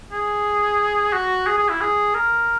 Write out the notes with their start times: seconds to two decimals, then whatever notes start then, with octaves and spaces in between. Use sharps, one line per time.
0.12 G#4
1.13 F#4
1.47 G#4
1.58 G#4
1.69 E4
1.81 G#4
2.14 A#4